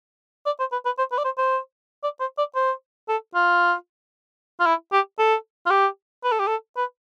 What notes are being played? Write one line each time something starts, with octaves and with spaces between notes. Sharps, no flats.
D5
C5
B4
B4
C5
B4
D5
C5
C5
D5
C5
D5
C5
A4
F4
F4
E4
G4
A4
F4
G4
B4
A4
G4
A4
B4